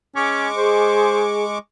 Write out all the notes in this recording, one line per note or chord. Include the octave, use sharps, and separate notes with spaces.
G#3 C#4 C#6 D6
G#4 C5